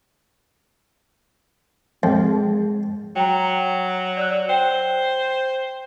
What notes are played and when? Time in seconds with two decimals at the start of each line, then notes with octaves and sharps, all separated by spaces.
2.03 F2 G#3
3.16 F#3 G5 A#5
4.17 D5 E6 F#6
4.49 C5 G5